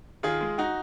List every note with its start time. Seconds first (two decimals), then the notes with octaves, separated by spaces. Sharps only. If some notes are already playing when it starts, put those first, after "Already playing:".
0.23 D#3 F4 G#4
0.41 G#3
0.58 D#4 F#4